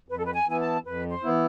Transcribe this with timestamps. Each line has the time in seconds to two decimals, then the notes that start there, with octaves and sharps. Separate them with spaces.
0.08 F2 B4
0.17 A4
0.24 B4
0.34 G#5
0.47 E3 B3 E4 G#5
0.60 A5
0.84 F2 B4
1.10 C5
1.23 E3 B3 E4